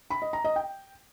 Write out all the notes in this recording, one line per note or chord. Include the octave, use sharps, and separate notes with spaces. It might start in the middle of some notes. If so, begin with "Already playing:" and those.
B5
D#5
A#5
D#5
G5